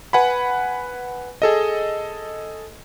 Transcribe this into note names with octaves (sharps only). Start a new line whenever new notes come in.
B4 F#5 G#5 B5
G#4 A4 D#5